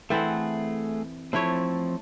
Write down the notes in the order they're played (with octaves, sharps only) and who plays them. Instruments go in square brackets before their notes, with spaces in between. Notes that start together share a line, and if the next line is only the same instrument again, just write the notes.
[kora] E3 C4 A4 [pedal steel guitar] A3 G#4 F#5
[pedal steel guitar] F3 C4 [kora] A3 E4 C#5